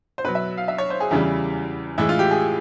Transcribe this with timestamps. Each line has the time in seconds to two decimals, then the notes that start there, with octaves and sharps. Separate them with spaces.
0.18 C5
0.24 B2 F#3 B4
0.35 E5
0.58 F5
0.68 E5
0.78 C#5
0.90 C5
1.00 G#4
1.11 E2 C#3 E3 G3 E4
1.98 A2 E3 G#3 E4
2.09 F4
2.19 G4
2.31 G#4